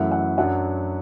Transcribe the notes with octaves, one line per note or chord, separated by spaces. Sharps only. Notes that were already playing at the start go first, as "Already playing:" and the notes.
Already playing: F#2 E3 A3 E4 F#5
F#5
F#2 F#3 D4 F#5